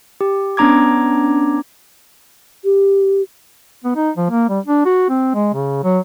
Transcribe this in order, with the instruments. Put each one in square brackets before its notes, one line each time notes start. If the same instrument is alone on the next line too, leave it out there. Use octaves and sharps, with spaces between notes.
[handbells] G4
B3 C#4 D4 A#5 D6 G#6
[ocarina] G4
[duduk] B3
D#4
F3
A#3
G3
D4
F#4
C4
G#3
C#3
F#3